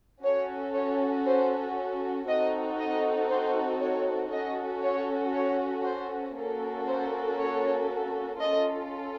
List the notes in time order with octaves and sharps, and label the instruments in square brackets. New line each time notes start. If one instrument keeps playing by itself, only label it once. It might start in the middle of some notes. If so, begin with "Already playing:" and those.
[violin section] C#4 F#4 A4 C#5
C#5
C5
C4 D#4 F#4 A4 D#5
D#5
C5
C#5
C#4 F#4 A4 D#5
C#5
C#5
C5
A#3 C#4 F#4 A4
C5
C#5
C#4 F4 A4 D#5